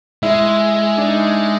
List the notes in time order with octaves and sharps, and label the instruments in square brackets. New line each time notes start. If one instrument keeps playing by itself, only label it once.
[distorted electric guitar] G#3 [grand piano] E4
[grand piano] D4
D#4